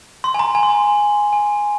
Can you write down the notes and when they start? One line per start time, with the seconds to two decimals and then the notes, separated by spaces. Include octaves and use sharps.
0.24 C6
0.34 G#5
0.39 A#5
0.55 G#5
0.63 C6
0.70 A#5
1.33 G#5